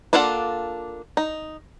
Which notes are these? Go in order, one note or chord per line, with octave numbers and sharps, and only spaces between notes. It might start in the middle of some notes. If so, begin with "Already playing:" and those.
A#3 D4 F4 A4 F#5
D#4